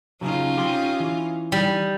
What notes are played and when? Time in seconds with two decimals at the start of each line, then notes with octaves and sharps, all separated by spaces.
0.21 C#3 F#3 C#4 D#4 F4
0.57 G4 G5 C6
1.00 E3
1.52 G3 D#4